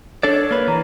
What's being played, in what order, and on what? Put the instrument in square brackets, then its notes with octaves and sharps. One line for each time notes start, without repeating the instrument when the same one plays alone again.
[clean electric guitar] D4 A4 D5 [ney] C#5
[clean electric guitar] A#3 B4
[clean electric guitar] E3 [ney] A#5